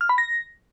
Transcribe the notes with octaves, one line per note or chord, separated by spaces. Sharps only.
F6
B5
A#6